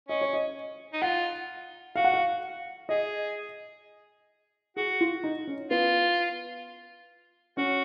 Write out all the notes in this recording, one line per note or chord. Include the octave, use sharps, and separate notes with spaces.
C#4 D#5
C#5
D#5
D#4
F4 F#5
F#4 F5
F#5
F5
G#4 D#5
F#4 G#4
F4
D#4
C#4
B3 F4
C#4 F#4